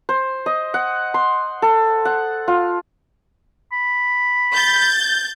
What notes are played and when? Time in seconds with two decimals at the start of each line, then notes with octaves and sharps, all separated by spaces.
0.09 C5
0.46 D#5
0.74 F#5
1.14 C6
1.62 A4
2.05 F#5
2.48 F4
3.72 B5
4.54 G6 A6